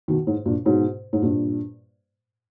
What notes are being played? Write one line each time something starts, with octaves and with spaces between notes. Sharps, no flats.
B2 D#3
G#2
G2 A#2
G#2 B2
G#2
G2 A#2